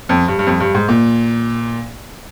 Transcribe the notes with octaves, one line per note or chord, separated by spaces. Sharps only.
F2
G2
G2
F2
G2
G#2
A#2